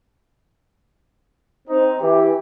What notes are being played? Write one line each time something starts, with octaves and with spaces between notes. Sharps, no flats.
C4 D#4
E3 G4